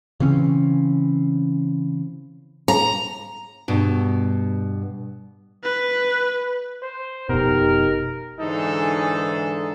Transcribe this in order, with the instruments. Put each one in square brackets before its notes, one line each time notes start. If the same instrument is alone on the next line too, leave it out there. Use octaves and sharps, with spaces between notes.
[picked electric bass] C#3 E3 C4 C#4
[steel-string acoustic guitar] A#5
G2 B2
[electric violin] B4
[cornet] C5
[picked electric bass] F1 B2 [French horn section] D#4 G4 [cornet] A#4
[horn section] G#2 D3 E3 D#4 G#4 A4